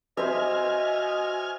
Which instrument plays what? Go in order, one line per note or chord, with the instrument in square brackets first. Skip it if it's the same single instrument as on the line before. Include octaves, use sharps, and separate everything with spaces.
[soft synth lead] F#4 [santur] C5 E5 [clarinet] D#5 [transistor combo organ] G#5 F6